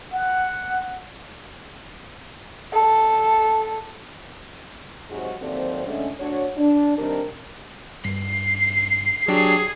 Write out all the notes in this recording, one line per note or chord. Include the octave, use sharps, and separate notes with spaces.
F#5
A4
G#2 C3 F#3 G#3 F#4
D#2 C3 F#3 C4 A4 D5
D3 G#3 A3 C#4
D2 D4 F#4 C#5
D4
C3 D#3 G3 D4 A#4
G2 C7
F#3 D4 G4 G#4